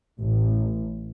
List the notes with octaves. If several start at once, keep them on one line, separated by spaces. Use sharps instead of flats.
A1